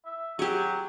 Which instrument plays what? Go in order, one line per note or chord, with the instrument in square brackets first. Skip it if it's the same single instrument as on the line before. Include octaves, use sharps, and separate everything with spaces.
[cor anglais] E5
[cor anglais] F#3 [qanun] G4 G#4